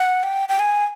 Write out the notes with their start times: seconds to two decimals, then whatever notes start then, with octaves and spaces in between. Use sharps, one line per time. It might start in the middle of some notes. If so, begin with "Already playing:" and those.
Already playing: F#5
0.23 G5
0.49 G5
0.59 G#5